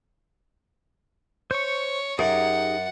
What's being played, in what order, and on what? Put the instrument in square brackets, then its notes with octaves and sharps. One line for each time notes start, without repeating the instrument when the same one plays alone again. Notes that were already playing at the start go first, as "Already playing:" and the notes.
[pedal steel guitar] C5 C#6 [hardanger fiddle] C#5
[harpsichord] F#2 [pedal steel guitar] D#4 G4 G#4 [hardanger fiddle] F#5